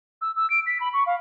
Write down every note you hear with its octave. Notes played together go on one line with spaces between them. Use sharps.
E6
E6
D7
B6
B5
C#6
F5